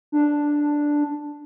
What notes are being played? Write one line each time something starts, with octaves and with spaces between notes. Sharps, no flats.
D4